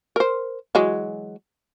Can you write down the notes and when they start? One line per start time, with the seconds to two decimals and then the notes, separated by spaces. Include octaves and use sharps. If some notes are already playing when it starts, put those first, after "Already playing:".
0.16 A#4 C5
0.75 E3 F#3 G#3